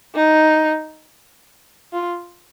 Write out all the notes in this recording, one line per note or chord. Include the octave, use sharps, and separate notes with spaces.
D#4
F4